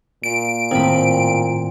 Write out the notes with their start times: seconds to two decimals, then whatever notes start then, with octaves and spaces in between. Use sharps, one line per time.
0.23 A#2 D7
0.71 A2 D#3 C4 B5